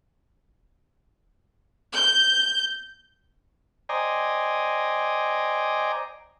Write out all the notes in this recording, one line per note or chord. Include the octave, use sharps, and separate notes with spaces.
G6
C5 D5 D#5 G5 G#5 A#5